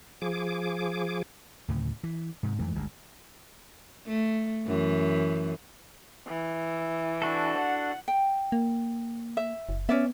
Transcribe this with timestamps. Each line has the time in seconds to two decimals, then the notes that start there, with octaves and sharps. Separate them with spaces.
0.22 F3 G#4 D6
1.68 D2 A2 C#3
2.04 E3
2.43 G#2 C3
2.59 F2 G#2 E3 A3
2.75 G1 D2 G#3
4.06 A3
4.66 F#2 E3
6.28 E3
7.22 D4 F#4 A4
7.58 F#5
8.08 G5
8.52 A#3
9.37 E5
9.69 F#1
9.89 B3 C#4 D5 E5